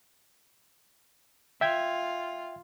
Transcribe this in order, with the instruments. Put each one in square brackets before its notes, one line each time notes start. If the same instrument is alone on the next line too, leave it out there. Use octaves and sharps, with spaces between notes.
[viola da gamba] F4 [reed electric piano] E5 G5 G#6